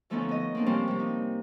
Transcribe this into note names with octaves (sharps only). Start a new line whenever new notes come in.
D3 F3 A3 B3 C#4 D#4
B3 D#5
A#3 C4 D4
C3 F3 G3 C4 C#4
C3 G3
D#4